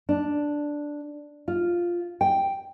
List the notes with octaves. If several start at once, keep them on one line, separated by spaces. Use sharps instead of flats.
D4
F4
G5